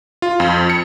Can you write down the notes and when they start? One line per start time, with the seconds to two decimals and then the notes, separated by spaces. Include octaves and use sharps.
0.22 F4
0.40 F2
0.70 C#7